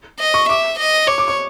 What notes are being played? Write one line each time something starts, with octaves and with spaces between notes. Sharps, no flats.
D#5
C#6
E5 D6
D#5
C#5 D6
D6
C#6